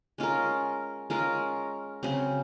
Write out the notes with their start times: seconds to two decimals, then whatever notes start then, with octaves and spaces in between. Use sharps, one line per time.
0.18 G#3 C#4 F4 A#4
1.10 G#3 C#4 F4 A#4
2.03 C#3 F#3 C4